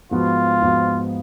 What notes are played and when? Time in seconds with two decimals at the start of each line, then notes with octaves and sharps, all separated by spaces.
0.11 G#2 F3 B3 F4 F#4
0.62 G#2 F3 B3 F#4